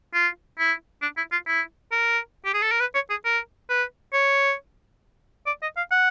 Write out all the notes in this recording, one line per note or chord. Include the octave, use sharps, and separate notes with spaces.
F4
E4
D4
E4
F4
E4
A#4
G4
G#4
A4
A#4
B4
C#5
G#4
A#4
B4
C#5
D5
D#5
F5
F#5